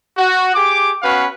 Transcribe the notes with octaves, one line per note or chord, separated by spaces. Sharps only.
F#4
G4 G#4 D6
B3 C#4 F#4 B4 F5